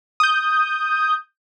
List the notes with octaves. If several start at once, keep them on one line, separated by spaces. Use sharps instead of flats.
D#6 G6